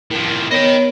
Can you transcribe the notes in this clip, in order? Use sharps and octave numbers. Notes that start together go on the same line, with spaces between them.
A2 F3 A#4
B3 A#4 C#5 D#5 G5